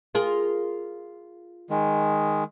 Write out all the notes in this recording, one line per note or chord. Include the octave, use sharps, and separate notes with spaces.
F4 G#4 A#4
D#3 G#3